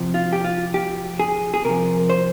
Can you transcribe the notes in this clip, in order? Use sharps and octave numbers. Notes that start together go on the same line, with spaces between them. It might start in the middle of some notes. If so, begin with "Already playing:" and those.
Already playing: C3 F3
F4
G4
F4
G4
G#4
G#4
C3 F3 A#4
C5